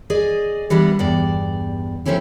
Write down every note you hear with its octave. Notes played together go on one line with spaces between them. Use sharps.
G#4 D5 D#5
E3 G3 B3 D4
E2 G2 D5
F3 F#3 A3 C4 C#4 E4